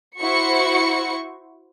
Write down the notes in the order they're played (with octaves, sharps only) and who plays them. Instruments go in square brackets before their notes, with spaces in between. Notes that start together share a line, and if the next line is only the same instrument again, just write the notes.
[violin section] E4 F#4 C5 C#6 C#7